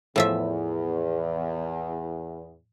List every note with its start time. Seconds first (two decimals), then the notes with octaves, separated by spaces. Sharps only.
0.16 E2 A2 F3 E5